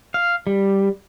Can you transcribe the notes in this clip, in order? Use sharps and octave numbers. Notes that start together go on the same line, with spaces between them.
F5
G3